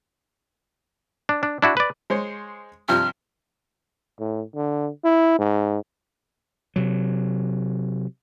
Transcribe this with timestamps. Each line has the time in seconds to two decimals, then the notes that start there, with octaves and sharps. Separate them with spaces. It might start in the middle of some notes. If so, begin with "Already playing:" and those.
1.29 D4
1.43 D4
1.62 D4 E4 F#4
1.77 B4 D5
2.10 G#3 C5 C#5
2.89 G2 C3 F3 F6
4.20 A2
4.55 D3
5.04 E4
5.39 G#2
6.76 C3 F#3